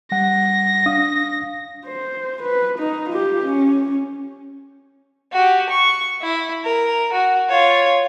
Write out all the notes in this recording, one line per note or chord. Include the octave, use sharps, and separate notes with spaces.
G3 F#5 A#6
D4 F5 D#6
C5
B4
D#4
F4 G4
C#4
F#4 G4
C#6
E4
A#4
F#4
F4 C#5